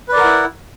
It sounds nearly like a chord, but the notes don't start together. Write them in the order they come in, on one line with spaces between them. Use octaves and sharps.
B4 D5 A#4 F#5 E4